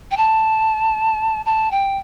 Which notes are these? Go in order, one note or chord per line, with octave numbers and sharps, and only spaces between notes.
G5
A5
A5
G5